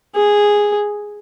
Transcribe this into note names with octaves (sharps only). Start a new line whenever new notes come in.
G#4